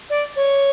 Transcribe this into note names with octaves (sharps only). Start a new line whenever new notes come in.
D5
C#5